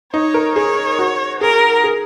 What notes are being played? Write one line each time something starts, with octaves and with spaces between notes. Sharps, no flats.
D#4 C#5
A#4
G#4 C#5
F#4
G#4 A#4
G#4